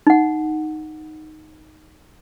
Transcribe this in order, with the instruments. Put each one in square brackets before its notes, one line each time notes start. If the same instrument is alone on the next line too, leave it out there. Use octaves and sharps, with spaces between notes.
[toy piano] D#4 F#5